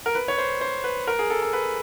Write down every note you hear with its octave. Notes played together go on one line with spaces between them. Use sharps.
A#4
B4
C#5
C5
C5
B4
A#4
G#4
A4
A4
B4